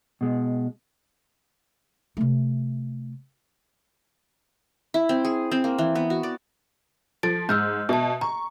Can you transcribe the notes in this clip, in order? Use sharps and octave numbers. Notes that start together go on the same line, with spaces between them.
B2 G#3
C3 A3
E4
C4
G#4
C4
A#3
E3
B3
F#4
D5
F3 A4 A6 D7
G#2 E6 F6 G6
B2 E5 A5
A#5 C#6